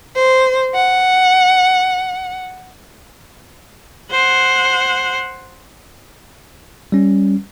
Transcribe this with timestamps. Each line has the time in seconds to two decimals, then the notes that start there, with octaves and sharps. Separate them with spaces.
0.15 C5
0.75 F#5
4.11 C5 F#5
6.92 G3 C#4